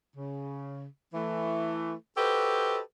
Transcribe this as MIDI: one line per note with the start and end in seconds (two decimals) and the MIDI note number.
0.16 0.85 49
1.14 1.95 52
1.14 1.95 57
2.18 2.80 66
2.18 2.80 67
2.18 2.80 69
2.18 2.80 71
2.18 2.80 72
2.18 2.80 75